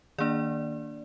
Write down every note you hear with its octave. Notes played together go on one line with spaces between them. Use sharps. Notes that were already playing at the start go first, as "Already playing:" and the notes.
D#3 A#3 D4 D5